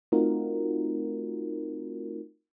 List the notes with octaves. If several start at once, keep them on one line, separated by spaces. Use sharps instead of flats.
A3 C4 D#4 F4 F#4 A#4